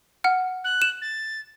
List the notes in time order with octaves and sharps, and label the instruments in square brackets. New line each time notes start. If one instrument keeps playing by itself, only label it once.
[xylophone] F#5 F6
[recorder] F#6
[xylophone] E7
[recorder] A6